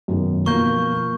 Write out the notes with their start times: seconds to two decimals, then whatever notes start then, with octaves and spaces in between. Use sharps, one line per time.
0.08 F#2 B2 D#3
0.46 B2 F3 A#3 C#6 G6